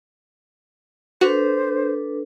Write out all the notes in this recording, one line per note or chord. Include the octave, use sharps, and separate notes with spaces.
D4 F#4 A4 B4 C5